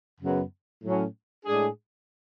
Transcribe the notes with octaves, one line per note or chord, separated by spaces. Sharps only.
F#2 C#3 F#3 B3
A2 F#3 C#4
A2 G#3 D4 G#4